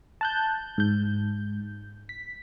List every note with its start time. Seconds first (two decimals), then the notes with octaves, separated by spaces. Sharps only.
0.21 A5 F#6 G6
0.78 G#2 G6
2.09 B6